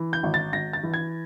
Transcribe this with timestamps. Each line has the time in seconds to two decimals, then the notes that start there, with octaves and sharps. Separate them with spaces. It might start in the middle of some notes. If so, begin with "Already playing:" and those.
Already playing: E3
0.13 G6
0.23 G#1
0.34 A6
0.53 G#1 A#6
0.73 A6
0.83 E3
0.94 G#6